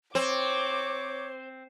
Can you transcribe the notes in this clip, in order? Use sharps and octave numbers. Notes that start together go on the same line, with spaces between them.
C4 C5 C#5 D6